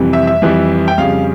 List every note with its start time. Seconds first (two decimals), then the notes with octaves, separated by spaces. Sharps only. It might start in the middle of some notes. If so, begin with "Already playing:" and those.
Already playing: F2 C3 E3 G3
0.13 E5
0.27 E5
0.42 F2 E3 G3
0.88 G5
0.98 F2 C#3 G3 F5